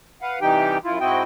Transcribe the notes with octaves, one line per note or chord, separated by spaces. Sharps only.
B4 F5 F#5
C3 E3 G3 D#4 G4 G5
F#2 E4 F4
G#2 C4 E4 F#4 D#5 G5